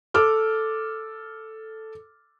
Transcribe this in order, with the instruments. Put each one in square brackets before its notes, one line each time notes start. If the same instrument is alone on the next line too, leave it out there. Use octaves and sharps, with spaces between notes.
[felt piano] A4 D6 F6